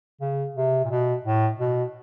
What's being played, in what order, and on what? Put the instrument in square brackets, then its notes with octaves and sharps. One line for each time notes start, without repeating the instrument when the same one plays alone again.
[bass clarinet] C#3
C3
A#2
B2
A2
B2